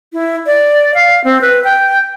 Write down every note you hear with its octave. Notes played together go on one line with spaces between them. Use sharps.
E4
D5
F5
C4
B4
G5